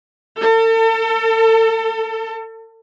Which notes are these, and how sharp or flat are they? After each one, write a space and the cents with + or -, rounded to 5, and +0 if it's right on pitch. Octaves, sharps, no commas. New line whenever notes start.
A4 +40